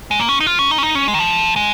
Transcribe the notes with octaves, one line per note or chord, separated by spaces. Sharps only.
G#3
A#3
C#4
D#4
F4
C#4
D#4
C#4
D#4
C#4
G#3
D#3
F3
G#3